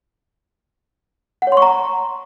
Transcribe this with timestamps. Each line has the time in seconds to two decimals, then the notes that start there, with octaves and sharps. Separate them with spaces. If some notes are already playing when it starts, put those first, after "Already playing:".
1.42 F#5
1.47 C#5
1.52 C6
1.57 C#6
1.62 A#5